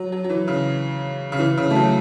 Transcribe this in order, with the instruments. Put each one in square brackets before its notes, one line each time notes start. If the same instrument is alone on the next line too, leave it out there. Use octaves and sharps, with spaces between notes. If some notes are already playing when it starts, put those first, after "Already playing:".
Already playing: [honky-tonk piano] F#3
F#3
F#3
E3
C#3
C#3
E3
C#3
A3
F#3